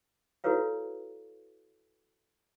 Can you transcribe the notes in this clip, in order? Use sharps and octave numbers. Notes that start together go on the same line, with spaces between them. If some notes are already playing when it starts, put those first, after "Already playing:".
E4 F#4 A4 B4 C#5 F5